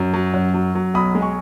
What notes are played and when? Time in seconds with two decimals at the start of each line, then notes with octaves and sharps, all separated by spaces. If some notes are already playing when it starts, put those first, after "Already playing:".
Already playing: F#2
0.14 F#3
0.34 F#2
0.54 F#3
0.75 F#3
0.94 B1 B5 D#6
1.15 G#3
1.21 G#5 C#6